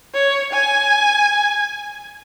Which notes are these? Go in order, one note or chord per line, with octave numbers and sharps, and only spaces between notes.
C#5
G#5